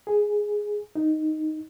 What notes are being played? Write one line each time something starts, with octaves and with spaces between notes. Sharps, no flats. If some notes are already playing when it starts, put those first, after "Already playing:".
G#4
D#4